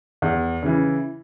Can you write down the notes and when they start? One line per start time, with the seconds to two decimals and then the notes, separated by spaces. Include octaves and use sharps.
0.22 E2
0.63 C#3 E3